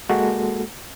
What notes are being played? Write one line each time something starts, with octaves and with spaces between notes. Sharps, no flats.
G#3 A#3 F#4 A4